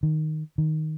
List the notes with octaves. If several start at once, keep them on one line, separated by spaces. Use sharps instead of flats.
D#3
D#3